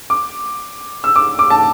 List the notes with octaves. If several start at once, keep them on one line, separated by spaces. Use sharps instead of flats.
D6
E6
D6
D6
A5